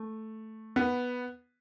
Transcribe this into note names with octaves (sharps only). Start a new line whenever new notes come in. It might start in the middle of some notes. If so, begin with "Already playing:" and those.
Already playing: A3
B3